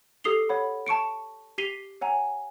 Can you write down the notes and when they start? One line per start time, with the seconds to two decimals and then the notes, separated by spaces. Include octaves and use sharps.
0.24 G4 A4 D#6 C7 F7 G7
0.49 C#5 F#5 B5
0.86 A5 C#6 C#7 D7
1.58 G4 B6 C7 D#7 F7 G7
2.01 C#5 F#5 G#5 A#5